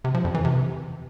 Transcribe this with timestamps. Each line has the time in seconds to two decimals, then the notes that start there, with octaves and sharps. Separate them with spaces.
0.04 C3
0.15 F3
0.25 F2
0.35 E3
0.45 C3